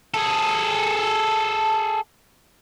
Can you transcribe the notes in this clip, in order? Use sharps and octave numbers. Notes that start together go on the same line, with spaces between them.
G#4 A4